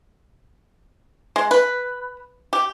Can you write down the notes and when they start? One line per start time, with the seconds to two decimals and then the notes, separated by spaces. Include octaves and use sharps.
1.36 G#3
1.51 B4
2.53 G4